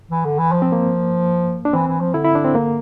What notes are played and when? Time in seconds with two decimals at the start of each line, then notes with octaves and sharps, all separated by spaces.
0.11 E3
0.25 D3
0.39 E3
0.52 F3
0.62 C4
0.72 A#3
1.65 D4
1.74 E3 C4
1.88 E3
2.01 F3
2.14 D3 E4
2.24 E4
2.35 D4
2.44 C4
2.55 A#3